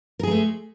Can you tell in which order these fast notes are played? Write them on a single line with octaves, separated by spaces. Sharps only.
A#4 G#4 G#3 A3